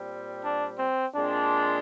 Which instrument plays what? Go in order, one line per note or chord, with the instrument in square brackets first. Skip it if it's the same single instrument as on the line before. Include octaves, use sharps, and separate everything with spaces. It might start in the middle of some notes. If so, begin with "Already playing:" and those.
Already playing: [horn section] A#2 G3 C4
D4
C4
A#2 G#3 C4 D4